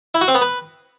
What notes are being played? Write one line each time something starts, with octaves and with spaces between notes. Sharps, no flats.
E4
F#4
C4
B3
B4